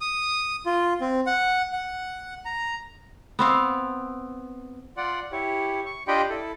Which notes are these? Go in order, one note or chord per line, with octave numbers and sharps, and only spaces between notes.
D#6
F4
C4
F#5
F#5
A#5
B3 C4 F5
F4 D5 F#5
E4 G4 C#5
C#6
D4 F4 G4 D#5 G5 B5
E4 A4